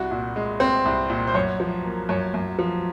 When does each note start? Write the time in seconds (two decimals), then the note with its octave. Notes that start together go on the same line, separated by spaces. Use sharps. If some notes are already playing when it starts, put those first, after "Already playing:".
Already playing: C2 F#4
0.11 A#2
0.36 G#3
0.60 C4
0.85 C2
1.10 A#2
1.27 C5
1.34 F#2 C#5
1.60 F3
1.84 A#3
2.09 F#2 C#5
2.34 F#2
2.59 F3